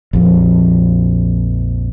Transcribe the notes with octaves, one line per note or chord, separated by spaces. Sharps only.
A#1 F2